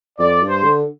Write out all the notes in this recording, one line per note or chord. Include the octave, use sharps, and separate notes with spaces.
F2 D5
G2
C5
D3